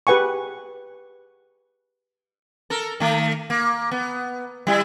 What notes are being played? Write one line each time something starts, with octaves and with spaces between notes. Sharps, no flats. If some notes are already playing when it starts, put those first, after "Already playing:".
G4 G#4 B4 F#5 G#5 C#6
A4 A#4
D#3 A3
A#3
B3
G3 E4